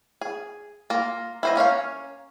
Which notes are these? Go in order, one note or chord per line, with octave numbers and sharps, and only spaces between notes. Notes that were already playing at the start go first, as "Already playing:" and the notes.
G#4
A#3 F4 A#4
E4 C5 D#5
A#3 C#4 C#5 F5